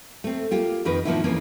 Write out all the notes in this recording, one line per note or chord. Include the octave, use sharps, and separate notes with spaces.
A3 C4
A#3 F4 G4
F2 D#3 A#4 B4
A2 D#3 F3 A#3 B3 E4
F2 E3 A#3 C4 C#4